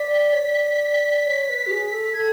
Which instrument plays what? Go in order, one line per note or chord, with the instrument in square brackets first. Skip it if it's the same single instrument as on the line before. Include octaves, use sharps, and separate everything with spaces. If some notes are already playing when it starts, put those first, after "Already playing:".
Already playing: [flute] D5 [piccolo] B6
[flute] C#5
D5
C#5
B4
F#4
G#4
A4
[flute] A4 [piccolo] G#6